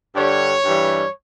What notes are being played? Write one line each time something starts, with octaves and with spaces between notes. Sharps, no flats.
G2 D3 G3 C#5
G2 E3 G3